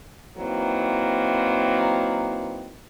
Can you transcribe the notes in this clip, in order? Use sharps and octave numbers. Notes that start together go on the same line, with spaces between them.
D#3 E3 F#3 A#3 C4